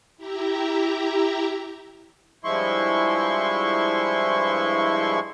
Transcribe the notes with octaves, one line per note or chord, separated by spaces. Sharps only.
E4 G4 E5 A#5
G2 F3 G#3 E4 C6 C#6